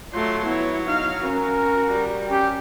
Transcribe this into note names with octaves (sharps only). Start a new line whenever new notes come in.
F#3 A3 F4 C6
B3 E4 C#5
D#4 F5 F6
C#4 F#4 A#4
G3
C#4 G4